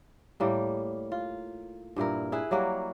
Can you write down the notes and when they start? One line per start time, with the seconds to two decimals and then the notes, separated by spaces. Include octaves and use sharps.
0.40 A2 G3 A#3
1.12 F4
1.96 G2 A#2 E4 A#4
2.32 E4 G#4 B4 E5
2.51 F#3 G3 A#3 F#4